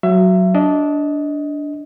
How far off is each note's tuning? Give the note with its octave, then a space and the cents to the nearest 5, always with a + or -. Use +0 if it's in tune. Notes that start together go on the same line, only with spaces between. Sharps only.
F#3 +0 E5 +30
D4 -10 D#5 +20